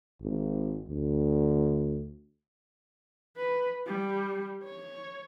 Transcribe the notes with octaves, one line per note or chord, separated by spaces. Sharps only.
G#1
D2
B4
G3
C#5